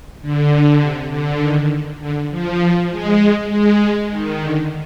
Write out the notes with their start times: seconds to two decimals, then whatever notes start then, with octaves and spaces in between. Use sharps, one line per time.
0.22 D3
0.81 C3
1.11 D3
1.41 D#3
2.01 D3
2.31 F3
2.60 F3
2.91 G#3
3.21 G#3
3.50 G#3
3.80 G#3
4.10 D#3
4.40 D3